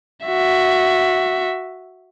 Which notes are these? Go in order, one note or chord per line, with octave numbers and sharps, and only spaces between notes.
F#4 E5